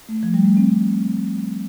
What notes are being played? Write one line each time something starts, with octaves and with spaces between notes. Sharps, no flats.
A3
F3
G3
A3
C4